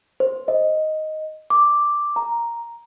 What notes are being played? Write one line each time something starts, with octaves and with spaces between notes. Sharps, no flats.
C5
D#5
D6
A#5